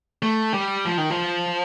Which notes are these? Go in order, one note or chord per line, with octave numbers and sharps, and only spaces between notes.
A3
G3
F3
D#3
F3